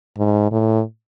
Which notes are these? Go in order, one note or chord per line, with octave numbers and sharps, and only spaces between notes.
G#2
A2